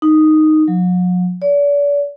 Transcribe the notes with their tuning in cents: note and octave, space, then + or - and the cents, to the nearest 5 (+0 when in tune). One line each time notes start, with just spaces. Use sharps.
D#4 -5
F#3 -45
D5 -40